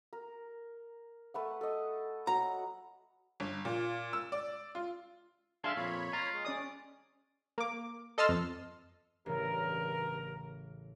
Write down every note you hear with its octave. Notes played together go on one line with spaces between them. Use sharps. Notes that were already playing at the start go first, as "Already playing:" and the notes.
A#4
A3 B4 F#5
A4 D#5
F#3 F#5 A#5
G1
A#2
E6
D5
F4
D4 G#4 E5 F5 A5 C6
F2 A#2 C#5 B5
F4 A#5
G#3
C#4 D5 D#6
A#3 D6
A4 D#5 A5 C6 E6 F6
F2
A1 G2 C#3 E3 A#4